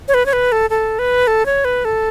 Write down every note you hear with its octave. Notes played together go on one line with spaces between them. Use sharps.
C#5
B4
C#5
B4
A4
A4
B4
A4
C#5
B4
A4